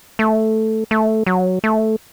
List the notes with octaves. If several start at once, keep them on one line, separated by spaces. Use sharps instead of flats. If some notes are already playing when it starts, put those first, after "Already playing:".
A3
A3
F#3
A3